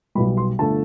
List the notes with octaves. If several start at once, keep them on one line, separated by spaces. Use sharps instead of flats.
B1 B2 G3 B5
C6
G1 D3 A3 A5